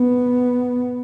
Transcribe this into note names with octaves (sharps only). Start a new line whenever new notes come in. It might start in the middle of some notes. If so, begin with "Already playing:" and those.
Already playing: B3